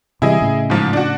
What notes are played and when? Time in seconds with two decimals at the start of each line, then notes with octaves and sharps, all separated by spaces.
0.22 C3 E3 G3 E4 G#4 D#5
0.41 A2 C#3
0.70 G#2 F3
0.93 D4 F#4